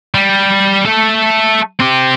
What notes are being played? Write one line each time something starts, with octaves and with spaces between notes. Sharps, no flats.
G3
A3 A4
C4 G4